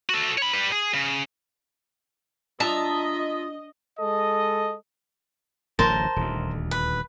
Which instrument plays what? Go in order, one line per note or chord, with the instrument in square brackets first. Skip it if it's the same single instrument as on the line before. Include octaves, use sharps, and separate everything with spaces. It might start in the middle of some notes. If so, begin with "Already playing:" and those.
[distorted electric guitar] F#4 A4
C#5 B5
G3 B4
G#4
C#3
[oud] D4 [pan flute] F4 [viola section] D#5 [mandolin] E5 A5 A#5
[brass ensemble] G#3 A4 D#5
[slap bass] D1 A1 F#2 [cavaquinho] A#4 C5 A5
[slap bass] D#1 D2
[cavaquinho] B4